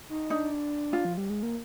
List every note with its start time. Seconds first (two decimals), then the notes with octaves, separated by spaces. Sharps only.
0.09 D#4
0.30 D4 D#4
0.93 F4
1.05 F3
1.17 G3
1.30 G#3
1.43 A#3